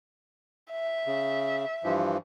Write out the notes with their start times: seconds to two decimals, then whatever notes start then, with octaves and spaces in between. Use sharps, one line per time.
0.71 E5
1.07 C#3
1.84 G2 E3 F3